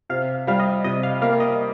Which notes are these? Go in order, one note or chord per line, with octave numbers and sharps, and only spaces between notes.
C3 F5
G3 F5
D#5
C3 D#5
F5
A#3 F5
D#5